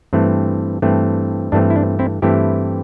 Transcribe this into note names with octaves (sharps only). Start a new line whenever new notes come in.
G2 E3 A3 C4
G2 E3 A3 C4
G2 E3 A3 C4 D4
E4
D4
C4 E4
G2 E3 A3 C4 E4 G4